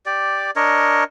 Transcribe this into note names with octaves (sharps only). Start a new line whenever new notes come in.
G4 D5
D4 A#4 C#5 D#5